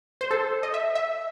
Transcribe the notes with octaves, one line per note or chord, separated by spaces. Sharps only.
C5
A4
D#5
E5
E5